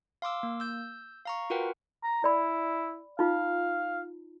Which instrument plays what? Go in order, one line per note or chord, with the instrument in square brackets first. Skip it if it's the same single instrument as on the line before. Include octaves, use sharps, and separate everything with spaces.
[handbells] F5 C6 D6 E6
A#3
E6 G6
F5 A#5 C#6
F4 F#4 A#4 B4 F#5 G5
[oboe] A#5
[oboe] E4 [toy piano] D5 B5
[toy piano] D#4 F4 [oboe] F5